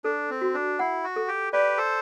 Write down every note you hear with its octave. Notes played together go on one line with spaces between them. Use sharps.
D4 A4
C4
F#4
D4
E4 F#5
F#4
A4
G4
G4 B4 D5
A4 C5